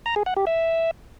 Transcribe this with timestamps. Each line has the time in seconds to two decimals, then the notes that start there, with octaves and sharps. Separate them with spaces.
0.06 A#5
0.16 G#4
0.26 F#5
0.37 G4
0.47 E5